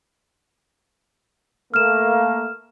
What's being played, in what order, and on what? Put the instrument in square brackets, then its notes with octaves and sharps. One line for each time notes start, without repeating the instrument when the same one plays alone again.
[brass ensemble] A3 A#3 [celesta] F6 E7